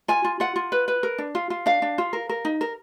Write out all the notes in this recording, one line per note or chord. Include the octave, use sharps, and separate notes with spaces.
F4 G#5
F4
F4 F#5
F4
B4
B4
A#4
D4
F4
F4
D4 F5
D4
F4
A#4
A#4
D#4
A#4